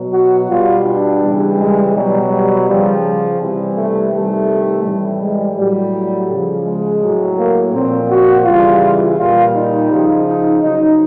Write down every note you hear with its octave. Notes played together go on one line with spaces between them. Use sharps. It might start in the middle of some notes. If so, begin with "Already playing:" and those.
Already playing: B2 F#3
F#4
B2 G3 F4
D4
C#3 E3 G3
G#3
B2 F#3 G3
G3
C#3 F3 G3
C3 E3 G3
A3
C3 D#3 G3 A3
A2 E3 G3
G#3
A2 F#3 G3
C#3 F3
G#3
A2 F#3
A#3
A#2 F3 C4
F#4
C#3 E3 G3 F4
A#2 G3 F4
D#4
C#3 F3
D#4
C#3 F#3 D#4